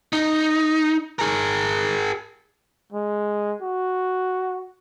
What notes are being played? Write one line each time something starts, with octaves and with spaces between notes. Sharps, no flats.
D#4
G#4 A#4
G#3
F#4